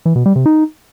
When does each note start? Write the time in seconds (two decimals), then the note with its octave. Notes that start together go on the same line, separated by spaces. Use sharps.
0.06 E3
0.16 B2
0.26 G3
0.36 C3
0.46 D#4